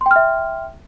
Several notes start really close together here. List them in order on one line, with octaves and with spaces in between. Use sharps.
C6 G5 F6 E5